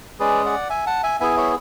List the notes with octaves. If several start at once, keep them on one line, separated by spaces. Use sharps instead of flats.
G#3 C#4 G#4 B4 D5
D5 F#5
E5 G#5
F#5 A5
E5 G#5
B3 E4 G#4 E5 G#5
C#5 E5